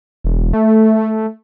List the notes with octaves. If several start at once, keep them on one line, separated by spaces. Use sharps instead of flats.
E1
A3